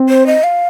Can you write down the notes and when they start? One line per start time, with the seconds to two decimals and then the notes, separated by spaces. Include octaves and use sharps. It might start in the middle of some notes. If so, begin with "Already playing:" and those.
Already playing: C4
0.09 C5
0.27 D#5
0.44 F5